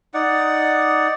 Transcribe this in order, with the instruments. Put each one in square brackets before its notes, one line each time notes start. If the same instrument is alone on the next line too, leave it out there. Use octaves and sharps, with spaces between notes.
[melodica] D#4 D5 F#5